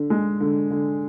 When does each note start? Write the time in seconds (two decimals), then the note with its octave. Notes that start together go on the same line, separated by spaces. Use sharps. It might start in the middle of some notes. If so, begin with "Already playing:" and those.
Already playing: D3
0.10 G#3
0.40 D3
0.71 D3